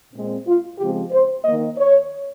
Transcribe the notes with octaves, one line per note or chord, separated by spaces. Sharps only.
A#2 G#3 C4
F4
C#3 F3 G#3 C4 G4
C5
D#3 A#3 D#5
C#5